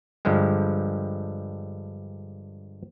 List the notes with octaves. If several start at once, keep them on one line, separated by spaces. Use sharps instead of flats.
G2 D3 F3 G3 G#3